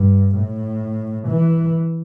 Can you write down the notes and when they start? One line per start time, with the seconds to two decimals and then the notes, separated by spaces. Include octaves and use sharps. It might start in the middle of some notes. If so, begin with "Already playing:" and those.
Already playing: G2
0.37 A2
1.28 E3